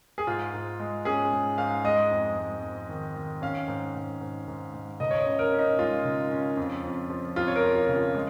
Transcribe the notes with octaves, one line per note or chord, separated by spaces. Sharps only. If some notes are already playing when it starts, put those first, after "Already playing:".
G#4
G#2 F4
G#2
G#3
C#4 G#4
G#2
G#2 F5
G#3 D#5
F2
G#3
F2
D#3
D#3
C#4 F5
G#2
G#2
G#2
G#2
G#2
C#2 D#5
C#5
D#5
C#3
A#4
C#4
D#4
G#3 F4
C#3
C#4
F2
F2
F3
F2 F4
C#5
A#4
F3
F4
C#3
F4
G#3